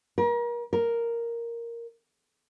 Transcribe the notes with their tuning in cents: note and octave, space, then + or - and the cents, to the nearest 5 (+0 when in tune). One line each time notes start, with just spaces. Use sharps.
A#4 +35
A#4 +0